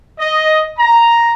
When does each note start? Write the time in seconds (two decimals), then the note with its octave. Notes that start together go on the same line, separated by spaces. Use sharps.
0.19 D#5
0.78 A#5